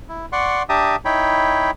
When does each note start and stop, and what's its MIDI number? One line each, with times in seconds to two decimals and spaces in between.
0.09 0.26 64
0.32 0.63 74
0.32 0.63 78
0.32 0.63 84
0.32 0.63 85
0.69 0.96 62
0.69 0.96 67
0.69 0.96 76
0.69 0.96 81
0.69 0.96 82
0.69 0.96 87
1.05 1.71 63
1.05 1.71 64
1.05 1.71 73
1.05 1.71 79
1.05 1.71 83